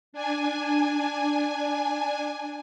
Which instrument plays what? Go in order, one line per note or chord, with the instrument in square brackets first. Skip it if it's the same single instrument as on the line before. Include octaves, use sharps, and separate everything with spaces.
[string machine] D4 G#5